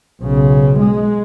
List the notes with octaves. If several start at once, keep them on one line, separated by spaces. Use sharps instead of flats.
B1 C#3
G#3